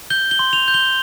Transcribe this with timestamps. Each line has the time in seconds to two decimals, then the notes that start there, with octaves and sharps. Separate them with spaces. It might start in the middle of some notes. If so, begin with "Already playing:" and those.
0.10 G6 G7
0.31 G7
0.39 C6
0.53 F7
0.68 G6
0.74 G7